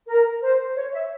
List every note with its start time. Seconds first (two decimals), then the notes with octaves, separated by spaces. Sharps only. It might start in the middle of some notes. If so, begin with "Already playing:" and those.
0.07 A#4
0.41 C5
0.76 C#5
0.93 E5